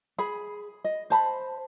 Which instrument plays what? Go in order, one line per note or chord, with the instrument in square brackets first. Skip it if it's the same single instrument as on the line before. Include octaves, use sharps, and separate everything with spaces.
[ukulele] G#4 B5
D#5
C5 A5 B5